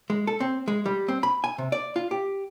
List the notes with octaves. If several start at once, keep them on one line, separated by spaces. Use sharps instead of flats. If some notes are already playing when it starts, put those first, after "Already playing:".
G#3
A4
C4
G#3
G3
C4
B5
G#5
C3
D5
F4
G4